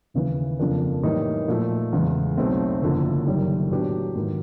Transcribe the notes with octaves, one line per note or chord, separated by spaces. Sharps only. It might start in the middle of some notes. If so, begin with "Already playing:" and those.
D#2 C#3 E3
F2 C#3 F3 A#3 D4
A2 E3 G3 A#3 D#4
A#2 F3 A3
E2 C#3 E3 G#3
B1 B2 F#3 A3 C4
F#1 F#2 D3 F3
F#1 F#2 D#3 G3
A2 F#3 B3 D4 G4
G#2 D#3 F#3